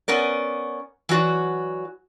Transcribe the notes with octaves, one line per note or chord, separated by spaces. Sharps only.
B3 C#4 A#4 D5
E3 F#3 F#4 D5